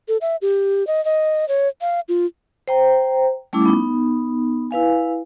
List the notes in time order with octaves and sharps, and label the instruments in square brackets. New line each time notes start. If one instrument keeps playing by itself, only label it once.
[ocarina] A4
E5
G4
D#5
D#5
C#5
F5
F4
[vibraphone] C5 G5 A#5
G3 A3 C#4 E4 D6
B3 D#4
E4 B4 F5 G#5